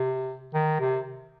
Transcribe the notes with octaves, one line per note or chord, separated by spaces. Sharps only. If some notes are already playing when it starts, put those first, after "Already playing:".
Already playing: C3
D#3
C3